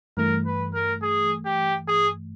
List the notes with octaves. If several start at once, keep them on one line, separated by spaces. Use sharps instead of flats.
G2 E3 A3 A#4
B4
A#4
G#4
G4
G#4